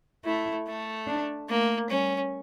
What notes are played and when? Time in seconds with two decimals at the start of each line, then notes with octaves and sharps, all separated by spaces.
0.25 A3 E4
0.67 A3
1.07 D4
1.49 A3 A#3
1.90 G3 C#4